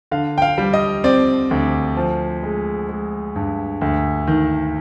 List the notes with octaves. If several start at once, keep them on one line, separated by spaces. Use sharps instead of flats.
D3 F5
G5
F5
G3
D#5
C4 D5
D2
F3
G#3
G#3
G2
D2
D#3